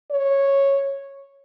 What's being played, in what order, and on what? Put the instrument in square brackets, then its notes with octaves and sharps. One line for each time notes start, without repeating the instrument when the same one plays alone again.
[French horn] C#5